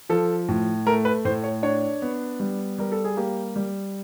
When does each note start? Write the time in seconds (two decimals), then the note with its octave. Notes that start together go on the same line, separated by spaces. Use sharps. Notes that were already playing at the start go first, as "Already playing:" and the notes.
0.09 F3 A4
0.49 A2
0.87 A3 A#4
1.05 B4
1.25 A2 C5
1.44 C#5
1.63 D4 C#5
2.02 B3
2.40 G3
2.78 G3 A#4
2.92 A4
3.04 G#4
3.17 A#3 G4
3.56 G3